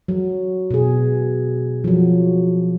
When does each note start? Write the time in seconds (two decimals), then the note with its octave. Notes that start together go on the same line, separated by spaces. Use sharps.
0.08 F#3
0.71 B2 G#4
1.84 F3 F#3